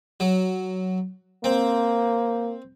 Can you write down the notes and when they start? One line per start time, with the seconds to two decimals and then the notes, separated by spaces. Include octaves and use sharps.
0.20 F#3
1.44 A#3 C4